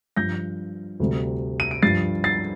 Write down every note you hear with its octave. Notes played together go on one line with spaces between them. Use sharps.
G2 F3 G6 A#6
D2 C3 G3
D#7
D7
G2 F3 A6 C7
A6 C7